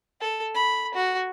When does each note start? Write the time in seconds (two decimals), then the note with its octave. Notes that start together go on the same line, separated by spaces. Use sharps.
0.21 A4
0.55 B5
0.95 F#4